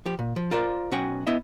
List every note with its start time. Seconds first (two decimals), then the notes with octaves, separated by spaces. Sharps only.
0.06 F3 G4
0.19 A#2
0.36 F3
0.51 F4 A#4 C5 D5
0.91 B1 C#4 F#4 G5 G#5
1.27 B3 E4 D#5 E5